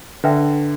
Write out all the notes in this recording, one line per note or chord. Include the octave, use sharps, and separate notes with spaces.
D3 B4 E5 G5